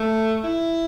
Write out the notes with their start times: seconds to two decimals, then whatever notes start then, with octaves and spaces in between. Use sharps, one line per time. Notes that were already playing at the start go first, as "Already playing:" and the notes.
Already playing: A3
0.44 E4